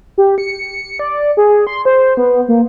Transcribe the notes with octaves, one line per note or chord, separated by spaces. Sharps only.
G4
C#7
D5
G#4
C6
C5
B3
A#3